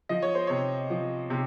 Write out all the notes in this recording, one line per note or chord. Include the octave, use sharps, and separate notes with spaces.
F3 D#5
C#5
C5
C3 C#5
F3
C3